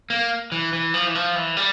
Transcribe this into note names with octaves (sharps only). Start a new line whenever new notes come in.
A#3
E3
E3
F3
E3
F3
E3
G3